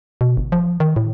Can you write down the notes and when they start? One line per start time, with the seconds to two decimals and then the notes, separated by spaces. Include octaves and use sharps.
0.21 B2
0.37 G1
0.52 F3
0.80 D#3
0.96 A2